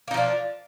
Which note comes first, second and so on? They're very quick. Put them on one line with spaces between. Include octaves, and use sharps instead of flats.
A#3 D#4 F3 D4